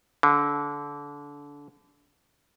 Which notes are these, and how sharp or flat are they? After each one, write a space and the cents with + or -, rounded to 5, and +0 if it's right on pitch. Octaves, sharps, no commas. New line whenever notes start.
D3 -25